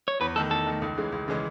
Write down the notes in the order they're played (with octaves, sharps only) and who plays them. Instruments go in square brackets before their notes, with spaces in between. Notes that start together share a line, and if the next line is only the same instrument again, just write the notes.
[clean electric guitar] C#5
[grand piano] E2 [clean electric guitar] B4
[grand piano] D#3 A3 [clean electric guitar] A4
[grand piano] E2 [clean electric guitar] A4
[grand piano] D#3 A3
C#2
C#3 E3 G#3
C#2
C#3 E3 G#3